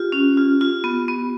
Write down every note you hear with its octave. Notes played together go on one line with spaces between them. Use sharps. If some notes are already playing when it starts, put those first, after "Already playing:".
Already playing: F4 G4
C#4
F4
F4
B3
B3